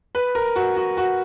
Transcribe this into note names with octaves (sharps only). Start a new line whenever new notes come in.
B4
A#4
F#4
F#4
F#4